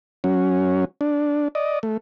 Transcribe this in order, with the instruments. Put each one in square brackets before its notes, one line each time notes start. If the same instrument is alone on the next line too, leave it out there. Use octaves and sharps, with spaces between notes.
[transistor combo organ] F#3 C#4
D4
D5 D#5
A3